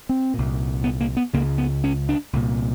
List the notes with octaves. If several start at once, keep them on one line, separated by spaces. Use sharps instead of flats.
C4
C2 A#2
B3
A#3
B3
C#2 C#3 A#3
B3
C#4
D4
C2 A#2